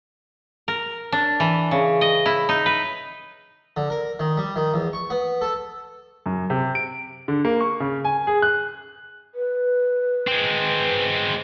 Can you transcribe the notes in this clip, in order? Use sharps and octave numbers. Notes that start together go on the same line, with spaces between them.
A#4
D4
E3
C#3
D#5
E4
D#4
B4
D3
A#4
D#3
G3
D#3
E2
C#6
B3
A4
F#2
C3
D7
D3
A#3
C#6
C#3
G#5
G#4
F#6
B4
G#3 C4